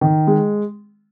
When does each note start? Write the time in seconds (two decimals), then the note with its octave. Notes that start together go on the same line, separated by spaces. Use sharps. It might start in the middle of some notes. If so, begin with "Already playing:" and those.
0.01 D#3
0.27 G#3